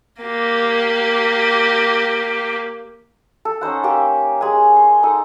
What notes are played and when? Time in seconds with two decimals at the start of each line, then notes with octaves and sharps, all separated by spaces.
0.22 A#3 G4
3.45 A4
3.61 C#4 D#4 C5 F#5
3.83 A#3 G4
4.41 G#3 G#5
4.76 C6
5.03 D#4 A4 D#6